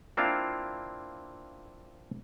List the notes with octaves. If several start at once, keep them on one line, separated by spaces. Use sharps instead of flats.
A#3 C4 D4 E4 F4 F5